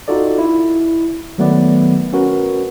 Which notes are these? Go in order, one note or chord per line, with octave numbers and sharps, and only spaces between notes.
D#4 F4 F#4 A4 D5
E4
D#3 F#3 A3 B3 B4 D5
C#4 F#4 A#4 B4